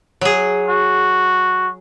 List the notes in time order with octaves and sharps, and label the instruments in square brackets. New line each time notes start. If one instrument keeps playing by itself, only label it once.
[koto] F#3 G#4
[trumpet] F#4